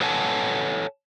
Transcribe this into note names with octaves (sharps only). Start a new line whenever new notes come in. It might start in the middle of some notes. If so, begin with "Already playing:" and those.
A4 B4 C#5 F#5 G#5 A5